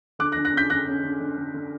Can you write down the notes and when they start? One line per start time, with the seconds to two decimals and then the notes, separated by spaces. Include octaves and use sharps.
0.19 D3 D6 F#6
0.32 F#6 A#6
0.36 D3
0.45 F#6 A#6
0.53 C#4 G6 B6
0.70 D3 F#6 A#6
0.87 C#4
1.04 D3
1.20 D3
1.37 D3
1.54 D3